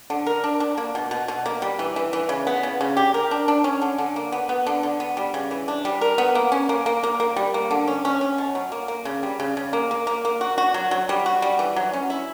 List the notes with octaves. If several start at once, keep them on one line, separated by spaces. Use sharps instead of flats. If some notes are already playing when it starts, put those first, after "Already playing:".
D3
A#4
D4
D4
A#3
B2
B2
B2
A#3
G3
E3
E3
E3
C#3
B3
C#3
C#3
G4
A#4
D4
D4
C#4
D3
D3
A#3
B3
B3
D3
D3
B3
G3
C#3
E3
D4
G3
A#4
B3
A#3
C#4
A#3
A#3
A#3
A#3
G3
A#3
D3
C#4
C#4
C#4
B2
F#3
A#3
A#3
C#3
G3
C#3
C#3
A#3
A#3
A#3
A#3
F#4
F#4
F#3
F#3
G3
F#4
G3
E3
F#3
C#4
E4